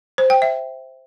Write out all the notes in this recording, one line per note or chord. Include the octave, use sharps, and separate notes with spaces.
C5
G5
E5